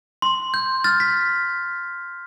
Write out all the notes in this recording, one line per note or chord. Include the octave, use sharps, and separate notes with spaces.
C6
G6
F6 A6
B6